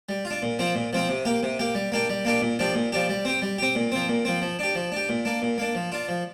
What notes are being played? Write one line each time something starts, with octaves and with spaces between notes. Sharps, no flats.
G3
F4
D4
A#2
F3 C4 F4
A#2
F3 C4 F4
C3
A#3 G4
C3
A#3 G4
G3
A#3 D4 G4
G3
A#3 D4 G4
A#2
F3 D4 G4
A#2
F3 D4 G4
G3
C4 G4
G3
C4 G4
A#2
F3 C4
A#2
F3 C4
F3
D4 G4
F3
D4 G4
A#2
A#3 D4
A#2
A#3 D4
F3
D4 F4
F3